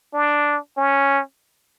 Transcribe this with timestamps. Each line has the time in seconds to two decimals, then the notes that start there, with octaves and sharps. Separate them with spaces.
0.14 D4
0.77 C#4